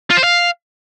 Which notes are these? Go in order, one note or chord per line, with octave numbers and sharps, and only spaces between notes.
F4
C5
F5